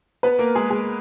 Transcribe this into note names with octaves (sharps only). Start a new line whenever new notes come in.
B3 B4
A#3 A#4
G#3 G#4
G#3 G#4